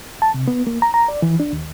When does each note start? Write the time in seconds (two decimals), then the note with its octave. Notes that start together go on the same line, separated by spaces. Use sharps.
0.22 A5
0.34 C3
0.48 B3
0.67 A#3
0.82 A#5
0.94 A#5
1.08 D5
1.22 E3
1.40 D4
1.53 D#2